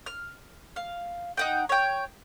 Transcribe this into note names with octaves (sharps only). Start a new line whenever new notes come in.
F6
F5
D#4 F#5 G5
C#5 G5